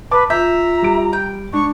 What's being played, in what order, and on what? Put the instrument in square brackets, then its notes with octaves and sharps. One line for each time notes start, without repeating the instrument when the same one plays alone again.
[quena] B4 [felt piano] A5 D6
[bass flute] F4 [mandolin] E5 [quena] A#5 [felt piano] G6
[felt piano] G3 D7
[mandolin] G5
[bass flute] G#3 [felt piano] D4 [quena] C#6